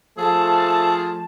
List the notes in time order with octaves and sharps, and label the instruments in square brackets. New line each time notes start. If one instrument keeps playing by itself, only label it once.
[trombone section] F3 A3 [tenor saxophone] G#4 [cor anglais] A4 [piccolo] A5